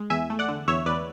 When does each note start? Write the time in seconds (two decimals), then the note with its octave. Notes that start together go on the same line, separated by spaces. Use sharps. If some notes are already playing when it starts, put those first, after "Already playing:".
Already playing: G#3
0.10 E2 E5 G#5
0.30 A3
0.39 D5 F#5
0.48 D3
0.67 E2 C#5 E5
0.86 E2 B4 D5